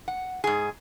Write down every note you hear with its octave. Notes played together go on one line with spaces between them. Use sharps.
F#5
G#2 G#4